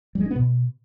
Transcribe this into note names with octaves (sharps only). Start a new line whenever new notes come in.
G3
G#3
D4
B3
B2